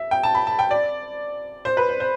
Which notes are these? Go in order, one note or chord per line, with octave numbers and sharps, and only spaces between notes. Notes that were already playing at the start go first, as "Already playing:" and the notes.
Already playing: E5
G5
A5
B5
A5
G5
D5
C5
B4
C5
C5